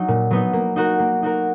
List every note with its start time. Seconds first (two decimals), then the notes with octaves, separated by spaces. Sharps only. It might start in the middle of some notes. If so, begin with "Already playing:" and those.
Already playing: F#3 D#4
0.08 A#2
0.31 F#3 B3 D#4
0.53 A#3
0.76 D#4 F#4 A#4
1.00 A#3
1.22 D#4 F#4 A#4